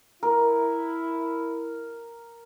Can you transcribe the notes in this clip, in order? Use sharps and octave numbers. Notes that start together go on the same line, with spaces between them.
E4 A#4